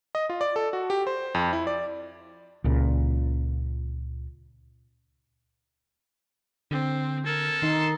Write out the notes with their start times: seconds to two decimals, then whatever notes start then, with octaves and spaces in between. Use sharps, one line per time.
0.15 D#5
0.30 F4
0.41 D5
0.56 A4
0.73 F#4
0.90 G4
1.07 C5
1.35 F2
1.53 E4
1.67 D5
2.64 C#2 A#2
6.71 D3 C4
7.26 A4 A#4 G#6
7.62 D#3 D#4 C6